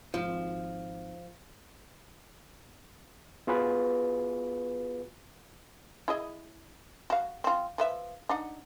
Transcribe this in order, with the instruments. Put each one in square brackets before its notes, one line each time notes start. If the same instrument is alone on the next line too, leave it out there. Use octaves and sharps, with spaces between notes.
[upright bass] G#1 [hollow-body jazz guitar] F3
[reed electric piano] B3 F4 F#4 G#4 B4
[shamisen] E4 G#4 D#5
F#4 F5
C4 F4
F3 B4 E5
D4 D#4 F#5